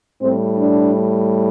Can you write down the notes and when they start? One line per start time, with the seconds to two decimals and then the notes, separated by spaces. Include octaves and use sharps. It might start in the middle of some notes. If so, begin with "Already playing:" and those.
0.22 A2 G3 C4
0.59 D4